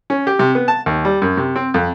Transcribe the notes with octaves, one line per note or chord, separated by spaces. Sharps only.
C#4
G4
C3
B3
A5
D#2
G3
F#2
C3
C4
F2